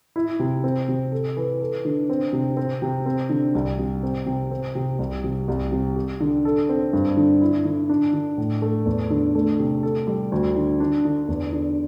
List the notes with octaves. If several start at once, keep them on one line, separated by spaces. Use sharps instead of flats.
E4
C3
C4
C3
A4
E3
A4
D3
C4
C3
C4
C3
C4
D3
C2
C3
C4
C3
C4
C3
C2
C3
C2
C3
G4
D3
A4
C4
G2
D3
E4
D3
D4
D3
A2
A3
E2
D3
A3
C3
A4
G3
D2
D3
D4
D3
E2
D3